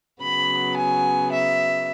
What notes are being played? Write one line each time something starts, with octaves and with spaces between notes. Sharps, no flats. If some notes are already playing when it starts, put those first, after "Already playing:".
C#3 F#3 B3 B5
G#5
E5